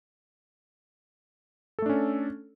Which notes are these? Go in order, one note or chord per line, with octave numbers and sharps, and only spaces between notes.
A3 C#4 D4 A4